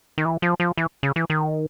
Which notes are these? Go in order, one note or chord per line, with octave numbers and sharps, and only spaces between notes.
D#3
E3
F3
F3
E3
C#3
E3
D#3